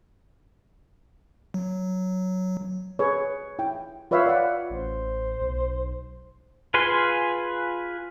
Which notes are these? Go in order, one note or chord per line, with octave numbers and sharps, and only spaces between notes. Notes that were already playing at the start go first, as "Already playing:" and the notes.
F#3
G#4 B4 C#5
E4 G5
F4 B4 C#5 E5 F5
D5 F#5
A1 C5
B1
F4 G#4 B4 G#5 C6